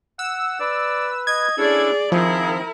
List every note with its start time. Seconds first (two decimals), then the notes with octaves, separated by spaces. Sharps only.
0.19 F#5 E6
0.60 B4 D5
1.27 D#5 G#6
1.58 C#4 D4 E4 G#4 A4 D5
2.12 D#3 F3 C4 E4 G#4 A#4